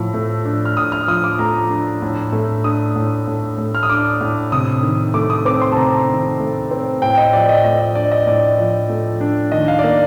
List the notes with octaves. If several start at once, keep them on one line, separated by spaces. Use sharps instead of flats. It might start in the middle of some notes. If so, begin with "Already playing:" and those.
Already playing: A2 F3
A3
D4
F6
A2 D#6
F6
F3 D#6
D6
A3 A#5
D4
A2
A3
D4 D#6
A2
A2
A3
F6
D#6
D4 D6
A2
C3 D#6
D#3
A3 D6
D#6
C4 D6
C6
A5
C3 A#5
D#3
A3
C4
A2 G5
D#5
F3 D5
D#5
A3 D#5
D#5
D4 D5
D#5
A2 D5
F3
A3
D4
D#3 D#5
F5
D5
A#3 D#5